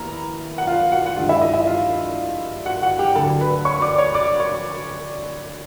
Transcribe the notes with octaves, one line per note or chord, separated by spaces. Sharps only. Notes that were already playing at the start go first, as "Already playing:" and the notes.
Already playing: D#2 B3 E4 A#4 A#5
F#5
F4 F5
F#4 F#5
F#5
G2 D#3 G#3 F4 F5
E4 E5
D#5
E4 E5
F4 F5
F#4 F#5
F#4 F#5
G4 G5
D2 D3 F#3 A4 A5
B4 B5
C#5 C#6
D5 D6
C#5 C#6
D5 D6
C#5 C#6